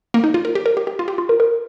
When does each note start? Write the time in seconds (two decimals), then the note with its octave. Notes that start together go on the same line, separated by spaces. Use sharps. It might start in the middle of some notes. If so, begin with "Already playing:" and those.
0.14 A#3
0.24 D#4
0.34 F4
0.45 A#4
0.55 G4
0.66 A#4
0.77 G4
0.87 G4
0.99 F4
1.08 G4
1.18 F4
1.29 A#4
1.40 A#4